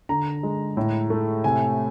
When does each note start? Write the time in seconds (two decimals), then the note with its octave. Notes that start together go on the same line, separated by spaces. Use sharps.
0.09 D3 A#5
0.43 G#3
0.77 A2
1.10 A3
1.44 C3 G#5